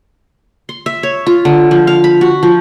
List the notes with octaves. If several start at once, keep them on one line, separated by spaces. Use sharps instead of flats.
C6
E5
C#5
F4
D3
F3
F5
B5
F#4
F3